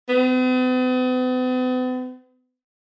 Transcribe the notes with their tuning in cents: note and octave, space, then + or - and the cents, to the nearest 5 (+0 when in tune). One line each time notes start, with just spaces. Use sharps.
B3 +45